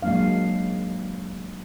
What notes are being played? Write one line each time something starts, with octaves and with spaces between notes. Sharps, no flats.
F#3 G#3 A#3 D4 F5